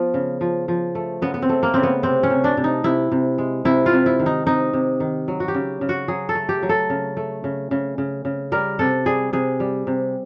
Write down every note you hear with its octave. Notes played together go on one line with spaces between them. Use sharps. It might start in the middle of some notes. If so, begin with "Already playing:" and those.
Already playing: F3 B3
C#3
F3
F3
A3
C#3 B3
B3
C4
A3
A#3
C#3 C4
B3
C3 C4
C#4
C3
D4
C3
D#4
C3 E4
C3
G#3
C3 E4
F4
C3
E4
D#3
D#4
C3 D#4
C3
D#3
F#3
F#4
G4
C#3
C#3
F#4
F#3 G#4
A4
A3
G4
F#3
A4
C#3
A3
C#3
C#3
C#3
C#3
G3 A#4
C3 A4
G3 G#4
C3 G#4
G3
C3